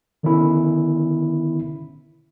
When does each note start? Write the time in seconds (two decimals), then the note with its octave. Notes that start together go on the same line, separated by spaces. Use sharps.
0.23 D3 D#3 B3 C#4 E4